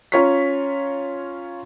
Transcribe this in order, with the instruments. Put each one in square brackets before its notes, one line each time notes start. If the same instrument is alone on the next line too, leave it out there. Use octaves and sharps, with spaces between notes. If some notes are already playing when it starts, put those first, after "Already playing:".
[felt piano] C#4 F4 C#5 A#5 C#6 B6